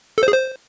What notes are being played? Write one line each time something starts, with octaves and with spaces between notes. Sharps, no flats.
A4
C5
G#4
C5